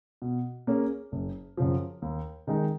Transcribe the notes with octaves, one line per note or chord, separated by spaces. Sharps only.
B2
A#3 C#4 G#4
F#1
F#2 C#3 F3
D#2
D#3 G#3 D#4